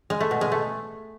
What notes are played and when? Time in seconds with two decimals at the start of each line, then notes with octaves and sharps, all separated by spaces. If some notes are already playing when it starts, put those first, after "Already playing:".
0.10 G#3
0.21 A3
0.31 B2
0.41 G#3
0.52 A3